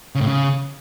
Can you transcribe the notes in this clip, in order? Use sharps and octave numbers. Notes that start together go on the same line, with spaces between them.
C#3
A2
C#3